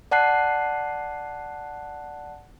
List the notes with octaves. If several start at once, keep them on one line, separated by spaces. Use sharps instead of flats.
D5 F#5 A5 F#6 C7